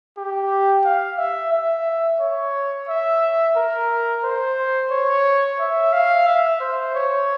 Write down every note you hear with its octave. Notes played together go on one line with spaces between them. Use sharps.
G4
F5
E5
E5
C#5
E5
A#4
C5
C#5
E5
F5
E5
C5
C#5